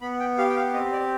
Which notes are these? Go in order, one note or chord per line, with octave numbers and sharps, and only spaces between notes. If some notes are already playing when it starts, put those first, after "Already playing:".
B3 B5
G5
G4 F5
G5
F5
C4 D#5
D5